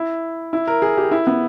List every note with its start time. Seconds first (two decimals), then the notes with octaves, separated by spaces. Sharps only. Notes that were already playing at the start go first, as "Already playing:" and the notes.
Already playing: E4
0.53 E4
0.67 A#4
0.82 G#4
0.98 G4
1.11 E4
1.27 B3